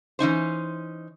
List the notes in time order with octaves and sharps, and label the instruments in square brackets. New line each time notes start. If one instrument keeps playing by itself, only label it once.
[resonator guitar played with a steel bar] E3 C#4 D#4 C5